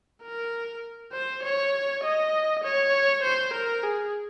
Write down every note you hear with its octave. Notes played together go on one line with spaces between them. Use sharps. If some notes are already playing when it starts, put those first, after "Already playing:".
A#4
C5
C#5
D#5
C#5
C5
A#4
G#4